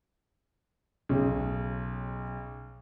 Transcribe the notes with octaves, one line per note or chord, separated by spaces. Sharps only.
B1 C#3